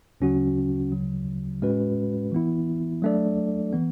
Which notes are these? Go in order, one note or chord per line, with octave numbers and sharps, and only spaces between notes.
D2 C#3 F#3 C#4 F#4
D2 C#3 F#3
A2 G#3 C#4 F#4 B4
E3 B3 E4
F#3 A3 D4 A4 D5
E3 B3